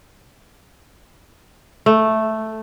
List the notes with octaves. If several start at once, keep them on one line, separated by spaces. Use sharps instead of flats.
A3